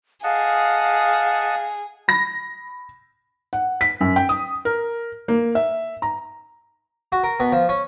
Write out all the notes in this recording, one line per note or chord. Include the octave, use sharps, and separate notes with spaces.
G#4 D#5 F5 F#5 A5
B5 A#6
F#5
B6
F#2
G5
D#6
A#4
A#3
E5
A#5
F#4
A#4
B2
F3
C#4